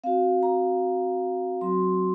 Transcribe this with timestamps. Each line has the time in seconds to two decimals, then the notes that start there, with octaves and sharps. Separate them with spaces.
0.04 C4 F#4 F5
0.43 A#5
1.61 F#3 C4 F#4 C6